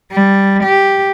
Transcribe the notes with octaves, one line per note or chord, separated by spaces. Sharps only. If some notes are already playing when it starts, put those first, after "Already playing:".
G3
G4